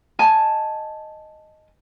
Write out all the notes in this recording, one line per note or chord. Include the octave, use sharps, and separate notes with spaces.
D#5 G#5 A5